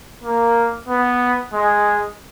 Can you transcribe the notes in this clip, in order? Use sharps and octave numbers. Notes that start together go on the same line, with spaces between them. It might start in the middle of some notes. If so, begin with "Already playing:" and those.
A#3
B3
G#3